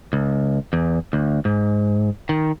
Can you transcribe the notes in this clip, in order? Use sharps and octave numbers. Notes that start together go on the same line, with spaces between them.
C#2
E2
D2
G#2
D#3